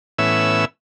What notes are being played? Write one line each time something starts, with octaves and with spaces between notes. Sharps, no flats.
A2 E3 B3 C#4 E5 E6